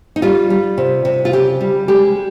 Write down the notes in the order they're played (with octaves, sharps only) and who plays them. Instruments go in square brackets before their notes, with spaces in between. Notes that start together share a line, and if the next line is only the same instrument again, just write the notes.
[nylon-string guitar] D#4
G3 F4
G3
C3
C3
F4
C#3 G4
G3
G#3 G4